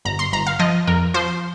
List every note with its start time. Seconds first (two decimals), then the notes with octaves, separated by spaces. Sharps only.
0.05 G1 A#5
0.19 C6
0.32 G1 A#5
0.47 F5
0.59 F3 D#5
0.87 F2 A#4
1.14 F3 C5